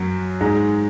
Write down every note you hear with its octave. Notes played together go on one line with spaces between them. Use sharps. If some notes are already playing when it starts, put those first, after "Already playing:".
Already playing: F#2 F#3
G#2 G#3